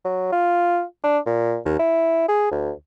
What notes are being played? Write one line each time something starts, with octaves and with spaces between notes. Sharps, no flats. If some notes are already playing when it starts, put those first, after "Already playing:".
F#3
F4
D4
A#2
D#2
E4
G#4
D2